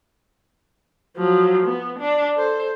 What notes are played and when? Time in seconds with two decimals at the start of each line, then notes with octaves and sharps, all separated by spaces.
1.17 F3 F#3
1.66 B3
1.99 D4
2.36 A4 C5